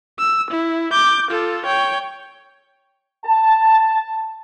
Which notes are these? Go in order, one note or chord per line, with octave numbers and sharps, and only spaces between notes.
E6
E4
D6 G6
F4 A4
C#5 G5
A5